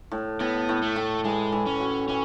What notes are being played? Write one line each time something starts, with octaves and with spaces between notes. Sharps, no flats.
A2
A2 B3
A2
A3
A2
E3 G#3
E3
C#4
F#4
E3 C#4